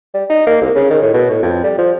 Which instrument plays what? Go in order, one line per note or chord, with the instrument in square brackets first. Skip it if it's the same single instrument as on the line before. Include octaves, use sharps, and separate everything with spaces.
[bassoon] G3
D#4
A#3
C2
C#3
D#3
A2
B2
A2
F2
G3
F3